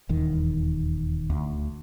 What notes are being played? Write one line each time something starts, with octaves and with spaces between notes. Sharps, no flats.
D#1 E2 D#3
D2